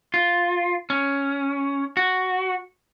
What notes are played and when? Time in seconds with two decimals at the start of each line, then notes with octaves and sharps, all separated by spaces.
0.14 F4
0.90 C#4
1.97 F#4